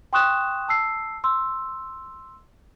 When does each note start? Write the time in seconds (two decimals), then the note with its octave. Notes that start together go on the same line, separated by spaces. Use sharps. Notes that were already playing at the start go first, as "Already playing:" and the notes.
0.13 G5 C6 C#6 D#6 F#6 E7
0.69 A5 E6 C7
1.24 C6 E6